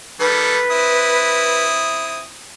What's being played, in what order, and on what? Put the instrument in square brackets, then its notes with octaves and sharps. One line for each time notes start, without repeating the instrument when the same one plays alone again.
[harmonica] D#3 G3 A4 [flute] B4
[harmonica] C4 E4 D#6